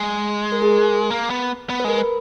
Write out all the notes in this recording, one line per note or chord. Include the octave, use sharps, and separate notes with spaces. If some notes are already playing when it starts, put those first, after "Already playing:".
Already playing: G#3
A#4
G#4
A#4
A#3
B3
B3
B4
G#3 A#4
B4